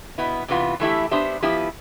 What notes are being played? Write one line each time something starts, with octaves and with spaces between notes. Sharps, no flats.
B2 B3 E4
C3 E3 B3 F4
E3 A3 E4 G4
B3 D4 G4 C5 E5
F3 B3 E4 G4